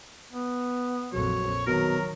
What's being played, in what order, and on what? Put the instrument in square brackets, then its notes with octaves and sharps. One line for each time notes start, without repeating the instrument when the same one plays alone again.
[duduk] B3
[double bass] A#1 F2 [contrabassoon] F#3 [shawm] C#5
[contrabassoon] B2 [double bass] D#3 [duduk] F#3 [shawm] A#4